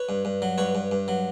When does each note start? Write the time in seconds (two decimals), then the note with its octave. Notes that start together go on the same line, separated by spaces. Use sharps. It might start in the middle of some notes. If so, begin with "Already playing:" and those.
Already playing: B4 C#5
0.09 G2
0.25 G2
0.42 F#3
0.58 G2 B4 C#5
0.75 G2
0.91 G2
1.08 F#3